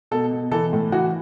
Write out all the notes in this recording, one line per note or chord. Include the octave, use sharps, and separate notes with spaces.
B2 A4
B2
E3 A4
A2
E3 F#4